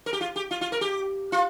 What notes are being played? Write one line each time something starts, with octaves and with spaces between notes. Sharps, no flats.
A#4
G4
F4
G4
F4
F4
A#4
G4
F4